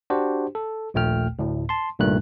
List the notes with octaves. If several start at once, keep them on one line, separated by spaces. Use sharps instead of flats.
D4 F#4 G4 C5
A4
A#1 D#2 A#2 A3 G5 F6
D2 A2
A5 C6
C2 G2 A#2 D#3 A3 F#6